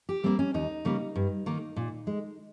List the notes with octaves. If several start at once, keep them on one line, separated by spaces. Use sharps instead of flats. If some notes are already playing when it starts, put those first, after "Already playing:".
G4
G3 A#3 C4
C#4
D#2 D#4
C#3 G3 A#3
G2
D#3 A#3
A#2
G#3